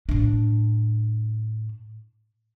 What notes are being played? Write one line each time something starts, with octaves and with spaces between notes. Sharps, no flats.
A2 D4